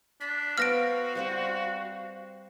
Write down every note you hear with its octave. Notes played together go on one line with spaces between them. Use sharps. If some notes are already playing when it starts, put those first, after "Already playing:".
D4 B6
B3 F#4 C5 F5 A5 F6 A#6 D7
G3 C4 C5